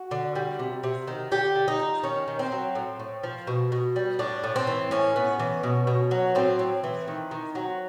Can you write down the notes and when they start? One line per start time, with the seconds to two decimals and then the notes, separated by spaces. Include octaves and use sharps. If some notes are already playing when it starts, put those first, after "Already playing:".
Already playing: F#4
0.11 D3
0.35 G3
0.59 C3
0.83 C3
1.07 D#3
1.31 D3 G4
1.55 D3
1.68 D#4
1.80 F3
2.03 D#3 C#4
2.28 D#3
2.39 C4
2.52 F#3
2.75 A2
2.99 A2
3.23 F3
3.47 B2
3.72 B2
3.96 G3
4.19 A2 D4
4.44 A2
4.56 C4
4.67 E3
4.91 A2 C#4
5.16 B3
5.39 E3
5.63 B2
5.87 B2
6.11 F#3
6.35 A2 C4
6.59 A2
6.84 E3
7.08 D#3
7.31 D#3
7.55 F#3